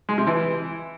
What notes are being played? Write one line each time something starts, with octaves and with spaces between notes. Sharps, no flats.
G#3
C3
E3